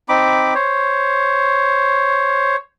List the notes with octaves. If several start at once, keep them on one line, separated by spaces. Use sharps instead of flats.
C4 D#4 B5 D6
C5 C#5